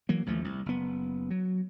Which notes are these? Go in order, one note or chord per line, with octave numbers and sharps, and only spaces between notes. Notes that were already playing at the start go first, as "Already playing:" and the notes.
E3 F#3 A#3
A1 D#2 F3 A3
C2
F#1 B3
F#3